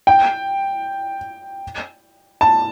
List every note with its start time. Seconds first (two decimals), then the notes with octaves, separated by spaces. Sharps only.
0.07 G5
2.41 A5